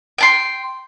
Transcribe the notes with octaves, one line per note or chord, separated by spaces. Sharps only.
G5 A5 C6